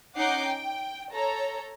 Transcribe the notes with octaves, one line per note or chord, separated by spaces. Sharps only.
C#4 D#4 F#5 D6 G6 C7
G5
A4 C#5 A#5